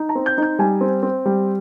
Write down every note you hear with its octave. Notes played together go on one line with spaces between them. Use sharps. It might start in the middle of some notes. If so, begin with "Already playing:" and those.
Already playing: D#4
A#5
C4
G6
D#4 G6
G3 G#5
C4
C4
G3